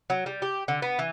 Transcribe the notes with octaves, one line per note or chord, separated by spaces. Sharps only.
F#3
G3
G4
D3
B3
E3